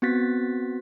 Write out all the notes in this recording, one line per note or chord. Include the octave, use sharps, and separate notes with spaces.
B3 C4 F#4 A6 B6